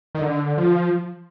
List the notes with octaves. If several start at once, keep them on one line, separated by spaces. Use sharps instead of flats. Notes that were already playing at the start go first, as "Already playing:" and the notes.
D#3
D3
F3